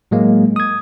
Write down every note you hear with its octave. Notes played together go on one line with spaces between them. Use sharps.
A2 F#3 G#3 A#3
D#6 G#6